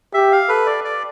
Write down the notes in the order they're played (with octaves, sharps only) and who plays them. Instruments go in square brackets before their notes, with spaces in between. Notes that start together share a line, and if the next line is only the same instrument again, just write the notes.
[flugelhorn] G4 [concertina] E5
[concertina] F5
[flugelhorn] A4 [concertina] B4
[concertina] D5
D5